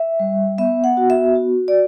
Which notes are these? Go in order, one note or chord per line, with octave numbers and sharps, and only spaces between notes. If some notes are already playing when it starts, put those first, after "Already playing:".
Already playing: E5
G3
B3 E5
F#5
F#4
E5
F#4
D5